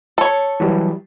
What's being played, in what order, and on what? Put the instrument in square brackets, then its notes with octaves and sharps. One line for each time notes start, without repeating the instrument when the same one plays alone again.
[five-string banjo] A4 C#5
[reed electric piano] E3 F#3 G3